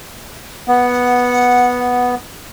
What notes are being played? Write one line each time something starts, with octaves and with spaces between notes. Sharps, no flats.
B3 F#5